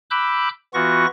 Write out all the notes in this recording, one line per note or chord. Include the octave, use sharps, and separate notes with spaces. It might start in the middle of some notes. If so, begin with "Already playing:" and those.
B5 D6 E6 F#6 G6
E3 B3 F4 F#4 C#6 A#6